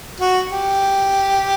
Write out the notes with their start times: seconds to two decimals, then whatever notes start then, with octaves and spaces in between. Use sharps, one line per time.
0.20 F#4
0.52 G4